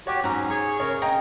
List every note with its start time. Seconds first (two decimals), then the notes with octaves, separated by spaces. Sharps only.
0.07 F#4 G4 C#5 D6
0.24 G#2 F#3 C#4 A#5
0.50 G#4 C#5 C#6
0.80 C#3 A#4 C#5
1.02 C#3 D#5 G5 A#5